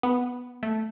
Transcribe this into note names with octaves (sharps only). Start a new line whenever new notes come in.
B3
A3